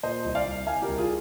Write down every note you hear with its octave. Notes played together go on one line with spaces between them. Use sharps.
A#2 C5 D#5
C2
D5 F5
C2
C2 F5 G#5
G4 A#4
C2
F4 G#4